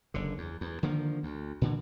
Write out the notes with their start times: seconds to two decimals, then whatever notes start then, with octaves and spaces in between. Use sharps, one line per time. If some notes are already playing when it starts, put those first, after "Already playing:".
0.14 F#1 D3
0.38 E2
0.61 E2
0.83 D3 D#3 F3 A#3
1.23 D2
1.61 A#2 D3 E3